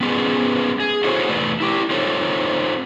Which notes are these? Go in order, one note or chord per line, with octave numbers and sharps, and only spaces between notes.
B3 C#4 F4 G#4 B4
G#4
E4 F#4 G#4 A4 C5 C#5
E2 A3 B4 D5
E4 G4
C4 D#4 F4 A4 C5 C#5